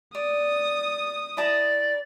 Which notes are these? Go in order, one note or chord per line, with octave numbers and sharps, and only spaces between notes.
D5 D#6
E4 D5 A5 A#5